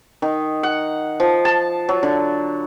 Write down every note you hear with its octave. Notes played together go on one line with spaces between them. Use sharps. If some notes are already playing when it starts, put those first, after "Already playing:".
D#3
F#5
F3
A5
F#3
D3